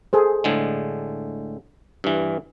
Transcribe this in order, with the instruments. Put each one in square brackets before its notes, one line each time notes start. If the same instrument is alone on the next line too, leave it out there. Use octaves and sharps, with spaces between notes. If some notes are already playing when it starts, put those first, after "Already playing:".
[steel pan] G#4 A4 C5
[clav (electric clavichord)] A2 D3 G#3
G2 E3